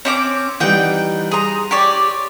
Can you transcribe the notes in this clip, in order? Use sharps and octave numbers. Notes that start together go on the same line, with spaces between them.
C4 C#4 C#5 D6
E3 G3 D#4 F#5 G5
G#4 A#5 C6 D#6
G4 C#5 D5